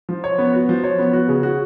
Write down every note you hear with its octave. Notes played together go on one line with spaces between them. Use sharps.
F3
C#5
B3
F#4
F3
C#5
B3
F#4
C#3
F#4